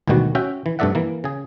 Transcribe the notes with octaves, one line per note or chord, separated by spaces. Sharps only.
G#1 D2 B2 D#3 G3 F#4
C#4 F#4 E5 G5
E3
G2 C3 A3 D5 E5 F#5
E3 A#3
C#3 G#4